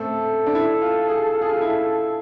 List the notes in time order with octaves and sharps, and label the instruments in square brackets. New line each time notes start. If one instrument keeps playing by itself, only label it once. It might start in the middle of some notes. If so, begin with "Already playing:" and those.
Already playing: [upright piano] A3 C4 [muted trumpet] A4
[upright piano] D4
E4
F4
G#4
F4
G#4
F4
E4